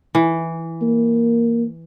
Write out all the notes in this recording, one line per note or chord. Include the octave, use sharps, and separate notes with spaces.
E3
A#3